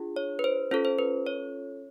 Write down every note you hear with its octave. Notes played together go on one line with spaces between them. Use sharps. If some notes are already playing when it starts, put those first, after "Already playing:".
Already playing: D4 F4 G#4
C#5
B4
C5
C#4 F4 A4 C5
C5
B4
C#5